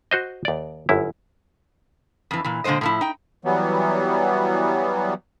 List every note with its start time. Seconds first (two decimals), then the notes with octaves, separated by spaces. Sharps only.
0.11 F#4 C5 D#5
0.45 D#2 D5
0.89 G1 F#2 E4
2.31 F2 E3
2.45 A#2 E3
2.64 A#2 D3 F3 G#3 C5 D#5
2.81 A2 F3 E4
3.01 D#4 G5
3.45 E3 F#3 G3 B3